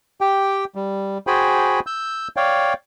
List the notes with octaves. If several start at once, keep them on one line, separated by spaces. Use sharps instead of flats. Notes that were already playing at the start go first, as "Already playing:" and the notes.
G4 G5
G3
F#4 G#4 C5 G5 G#5 B5
E6 G6
C#5 D5 F5 G5